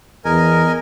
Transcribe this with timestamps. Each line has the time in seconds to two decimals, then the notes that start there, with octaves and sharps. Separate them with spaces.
0.25 E2 A#4 D#5 G#5